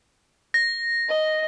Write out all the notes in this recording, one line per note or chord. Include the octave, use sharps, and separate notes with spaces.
A#6
D#5